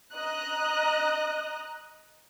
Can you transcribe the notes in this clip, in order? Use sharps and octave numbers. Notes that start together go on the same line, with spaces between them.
D#5 A#5 F#6